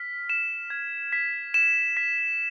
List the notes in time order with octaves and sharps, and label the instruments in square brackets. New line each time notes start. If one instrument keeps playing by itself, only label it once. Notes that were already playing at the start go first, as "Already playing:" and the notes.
Already playing: [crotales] F6 B6
E7
G#6
B6
E7
B6